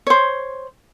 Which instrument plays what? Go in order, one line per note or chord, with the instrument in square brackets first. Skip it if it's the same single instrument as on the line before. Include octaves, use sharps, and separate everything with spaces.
[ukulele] C5 C#5